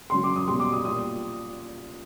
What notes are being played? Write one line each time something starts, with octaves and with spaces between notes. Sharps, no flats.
C#3 F#3 C6
D6
D#6
B2 G3 C6
D6
D#6
A#2 G3 D#6